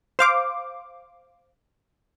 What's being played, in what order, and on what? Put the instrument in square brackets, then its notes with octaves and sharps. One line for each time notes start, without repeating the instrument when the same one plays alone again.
[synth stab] C5 F5 D6